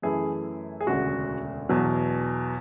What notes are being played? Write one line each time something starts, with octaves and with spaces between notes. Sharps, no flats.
F#2 E3 A3 E4 G#4
G#4
E1 D2 C#3 F#4
E2 B2 F#3